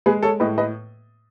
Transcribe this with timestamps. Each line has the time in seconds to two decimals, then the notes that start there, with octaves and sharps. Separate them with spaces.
0.06 G#3 G#4 B4
0.22 A4 C#5
0.40 A2 B4 D#5
0.58 B4 D#5